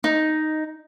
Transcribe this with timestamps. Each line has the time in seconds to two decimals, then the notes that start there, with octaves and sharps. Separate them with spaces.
0.04 D#4